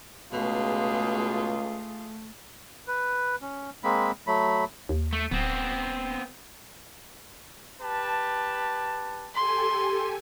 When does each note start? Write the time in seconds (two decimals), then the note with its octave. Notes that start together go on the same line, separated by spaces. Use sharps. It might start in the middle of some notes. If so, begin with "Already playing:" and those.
0.33 C#2 B2 A3 F4 G#4
2.87 B4
3.42 C#4
3.84 G#3 A#3 C4 B5
4.27 F#3 A3 B5
4.89 D#2
5.13 A3
5.31 D1 B3 C4
7.82 G4 B4 A5
9.35 G4 A4 G#5 C6